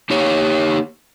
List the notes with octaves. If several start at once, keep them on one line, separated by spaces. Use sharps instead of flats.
A#3 D#4 G4 C#5